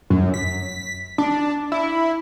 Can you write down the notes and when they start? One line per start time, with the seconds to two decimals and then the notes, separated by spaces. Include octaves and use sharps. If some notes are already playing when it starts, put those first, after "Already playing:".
0.10 F#2
0.34 B6
1.18 D4
1.72 E4